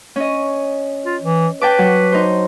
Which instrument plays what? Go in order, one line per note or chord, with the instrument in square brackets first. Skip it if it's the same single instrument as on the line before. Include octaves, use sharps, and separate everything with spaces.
[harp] C#4 D#5
[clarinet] F4
E3
[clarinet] B4 [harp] G5 A5 D6
[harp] F#3
D#4 C5